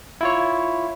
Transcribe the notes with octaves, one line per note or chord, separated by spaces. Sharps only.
E4 F4 C#5